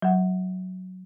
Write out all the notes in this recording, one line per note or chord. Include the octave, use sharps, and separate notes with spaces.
F#3 F#5